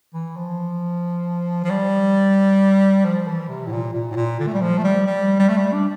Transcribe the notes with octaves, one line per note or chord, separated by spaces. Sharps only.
E3
F3
F3
G3
F3
E3
C3
A2
A#2
A#2
A2
A#2
D3
A3
G3
F3
A3
G3
G3
G3
A3
G3
D4